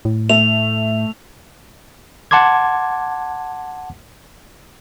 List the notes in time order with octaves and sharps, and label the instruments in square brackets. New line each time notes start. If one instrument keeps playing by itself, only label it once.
[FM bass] A2
[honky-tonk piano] A3 [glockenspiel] F7
[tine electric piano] F#5 A5 C6 D6 G#6